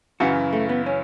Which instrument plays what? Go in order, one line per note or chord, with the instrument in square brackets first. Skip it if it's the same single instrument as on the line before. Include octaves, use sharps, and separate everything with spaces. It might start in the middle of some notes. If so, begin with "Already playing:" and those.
[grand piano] F#2 C#3 E3 [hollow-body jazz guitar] F#4
[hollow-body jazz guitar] A3
B3
C#4